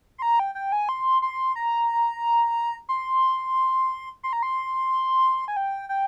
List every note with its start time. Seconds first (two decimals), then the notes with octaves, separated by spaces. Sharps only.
0.18 C6
0.22 A#5
0.39 G5
0.55 G5
0.72 G#5
0.89 C6
1.22 C6
1.56 A#5
2.89 C6
4.23 C6
4.33 A#5
4.43 C6
5.48 G#5
5.57 G5
5.89 G5